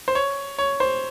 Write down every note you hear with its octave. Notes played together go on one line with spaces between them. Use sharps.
C5
C#5
C#5
C5